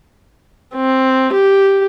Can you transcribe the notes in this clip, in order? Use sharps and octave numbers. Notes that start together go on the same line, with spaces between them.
C4
G4